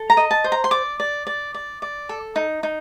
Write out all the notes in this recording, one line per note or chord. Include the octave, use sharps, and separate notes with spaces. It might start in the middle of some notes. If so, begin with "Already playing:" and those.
Already playing: A4
A#5
D#5
A5
C5
A#5
C6
D5 D6
D5
D5
D5
D5
A4
D#4
D#4